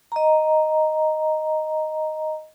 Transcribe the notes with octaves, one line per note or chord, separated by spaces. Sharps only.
D#5 A#5